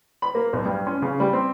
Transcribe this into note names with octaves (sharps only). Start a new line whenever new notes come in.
B5
A#3
B1
G2
C#4
C#3
G3
C4